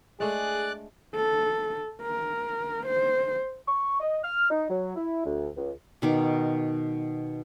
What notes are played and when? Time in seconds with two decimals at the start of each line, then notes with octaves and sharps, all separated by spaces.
0.20 G#3 A3 D4 G#4 D5 F#6
1.15 A4
2.02 A#4
2.87 C5
3.67 C#6
4.00 D#5
4.24 F6
4.50 D#4
4.70 F#3
4.96 E4
5.26 D2
5.57 C#2
6.02 B2 D#3 D6